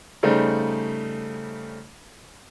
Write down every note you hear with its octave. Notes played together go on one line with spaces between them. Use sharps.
C#3 G3 A3 D#4 C5